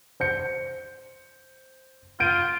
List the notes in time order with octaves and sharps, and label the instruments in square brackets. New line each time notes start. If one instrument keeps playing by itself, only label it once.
[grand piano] C5 G6 C#7
[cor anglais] F4 [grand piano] G6 D7 D#7